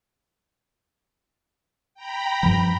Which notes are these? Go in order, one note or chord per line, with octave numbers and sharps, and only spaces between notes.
G5 A#5 B5
G2 F3